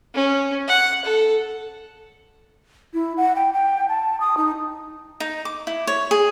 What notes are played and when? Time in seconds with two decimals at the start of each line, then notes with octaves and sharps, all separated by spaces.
0.14 C#4
0.68 F#5
1.05 A4
2.94 E4
3.17 F#5
3.35 G5
3.54 G5
3.89 A5
4.20 D#6
4.37 D#4
5.20 D#4
5.45 D6
5.67 E4
5.87 C#5
6.11 G#4